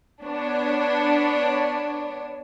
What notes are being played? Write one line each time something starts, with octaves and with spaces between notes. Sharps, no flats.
B3 D4 C#5